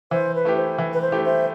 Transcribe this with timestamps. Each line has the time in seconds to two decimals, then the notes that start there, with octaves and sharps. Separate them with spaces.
0.10 E3 C5
0.34 B4
0.45 A3 E4 G4
0.56 C5
0.78 E3
0.92 B4
1.01 C5
1.12 A3 E4 G4
1.24 C5 E5